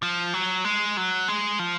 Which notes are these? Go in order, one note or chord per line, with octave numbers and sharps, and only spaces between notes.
F3
F#3
G#3
F#3
G#3
F3